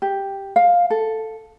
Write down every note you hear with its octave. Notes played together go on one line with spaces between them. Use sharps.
G4
F5
A4